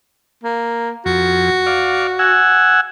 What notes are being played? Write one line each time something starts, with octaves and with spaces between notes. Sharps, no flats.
A#3
F2 F#4
D5 F5
F#5 G#5 E6